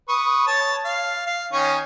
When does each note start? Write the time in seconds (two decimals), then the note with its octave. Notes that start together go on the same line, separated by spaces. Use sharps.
0.09 B4 C#6 D#6
0.47 C#5 A5
0.85 F5
1.27 F5
1.53 D#3 C#4 C#6